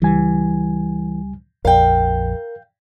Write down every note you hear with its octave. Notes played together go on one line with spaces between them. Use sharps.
C#2 E3 G3 G#5
A#1 F2 A#4 F5 G5